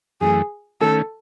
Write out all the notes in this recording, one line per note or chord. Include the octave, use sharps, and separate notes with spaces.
F#2 E3 A3 G#4
D#3 A3 C#4 A4